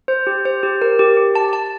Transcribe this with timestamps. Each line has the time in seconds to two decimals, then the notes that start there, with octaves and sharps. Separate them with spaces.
0.08 C5
0.27 G4
0.45 C5
0.63 G4
0.82 A#4
0.99 G4
1.17 G4
1.35 A5
1.53 A5